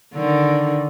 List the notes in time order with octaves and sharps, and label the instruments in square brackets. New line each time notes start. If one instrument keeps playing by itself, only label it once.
[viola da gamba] D3 D#3